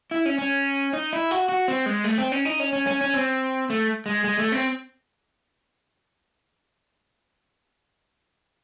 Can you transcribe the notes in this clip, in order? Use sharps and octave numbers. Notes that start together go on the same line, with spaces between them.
E4
C#4
C#4
D#4
E4
F#4
F#4
C4
G#3
A3
C4
C#4
D#4
C#4
C#4
C#4
C#4
C4
A3
G#3
G#3
A3
C4